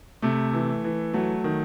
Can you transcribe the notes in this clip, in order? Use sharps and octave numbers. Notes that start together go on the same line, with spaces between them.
C3 A3
E3
E3
F#3 A3
D#3